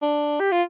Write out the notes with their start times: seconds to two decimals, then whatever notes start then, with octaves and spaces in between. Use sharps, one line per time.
0.02 D4
0.40 G4
0.52 F4